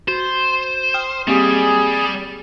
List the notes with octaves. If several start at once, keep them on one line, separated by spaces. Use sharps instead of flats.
F#4 C5
G5 D#6 F6
G3 A#3 C4 G4 G#4
A6